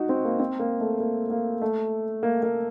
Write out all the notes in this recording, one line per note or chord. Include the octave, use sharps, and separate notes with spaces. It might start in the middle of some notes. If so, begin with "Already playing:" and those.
Already playing: D#4 F#4
C4
A#3
C4
A#3
A3
A#3
A#3
A3
A#3
A#3